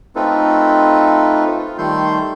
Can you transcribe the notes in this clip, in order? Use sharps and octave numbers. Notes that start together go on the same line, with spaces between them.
A3 C4 D#4 F4 A4 B4
F4
D#3 G3 A3 A4 C6 G6